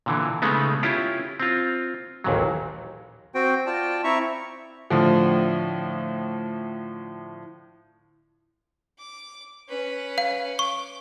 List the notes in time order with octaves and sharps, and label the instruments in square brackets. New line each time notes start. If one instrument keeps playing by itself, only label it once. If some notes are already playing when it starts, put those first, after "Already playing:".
[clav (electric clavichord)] A#2 D3 E3
C#3 G#3 A3 B3 D#4
C#4 E4 F4 G4
C4 F4
A1 D#2 A#2 F#3
[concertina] C4 F#4 C5 G5
F4 D5 G5 A5
C4 E4 E5 A#5 C#6
[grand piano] A2 D3 F3
[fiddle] D6
C#4 B4
[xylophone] F5
[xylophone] C#6 [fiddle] D6